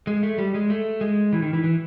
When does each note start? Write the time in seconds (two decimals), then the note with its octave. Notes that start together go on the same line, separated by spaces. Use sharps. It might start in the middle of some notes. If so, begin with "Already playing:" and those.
0.07 G#3
0.23 A3
0.38 G3
0.54 G#3
0.70 A3
1.01 G#3
1.33 E3
1.42 D#3
1.53 E3
1.64 E3